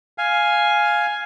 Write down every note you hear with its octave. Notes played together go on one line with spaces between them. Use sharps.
F5 G#5